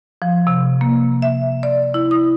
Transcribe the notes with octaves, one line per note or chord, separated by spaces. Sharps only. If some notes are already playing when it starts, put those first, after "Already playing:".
F3
C3
A#3
E5
D5
E4
D#6